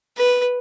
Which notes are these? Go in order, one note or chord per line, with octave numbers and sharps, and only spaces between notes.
B4